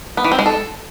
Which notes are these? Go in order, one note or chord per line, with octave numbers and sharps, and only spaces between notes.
B3
E3
C4
G#3
A4